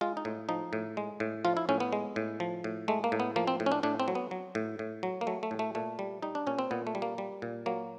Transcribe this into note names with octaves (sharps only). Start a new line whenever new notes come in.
G#3 F4
D#4
A2
F3 D#4
A2
G#3
A2
F3 F4
E4
A2 C#4
B3
G#3
A2
F3
A2
G#3 A3
A#3
A2
B3
F3 A#3
C4
A2
C#4
D4
A2 D4
C4
F#3
B3
F#3
A2
A2
F#3
A#3
F#3 A3
A3
A2
A3
A#2 A3
G3
G3 D#4
D4
A#2 C#4
C4
A#2 B3
A3
G3
A#3
G3
A#2
F#3 A#3